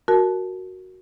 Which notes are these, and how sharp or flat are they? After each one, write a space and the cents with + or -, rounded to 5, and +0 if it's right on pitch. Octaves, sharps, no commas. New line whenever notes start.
F#4 +0 A#4 +0 A5 -20